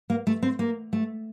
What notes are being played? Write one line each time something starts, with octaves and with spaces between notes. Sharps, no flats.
A#3
A3
C4
A#3
A3